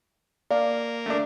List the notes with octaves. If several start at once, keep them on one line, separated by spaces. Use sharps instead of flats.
A#3 D5 F5
A3 D4